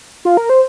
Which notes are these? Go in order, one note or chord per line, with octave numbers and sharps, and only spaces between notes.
F4
A#4
C5